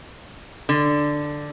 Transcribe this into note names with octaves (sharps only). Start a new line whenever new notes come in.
D3